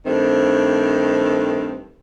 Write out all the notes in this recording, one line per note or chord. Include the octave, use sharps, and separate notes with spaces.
G2 D#3 A3 C4